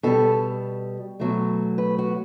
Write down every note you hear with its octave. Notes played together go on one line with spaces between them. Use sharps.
B2 G3 A4
B2 F#3 A3
B4
F#4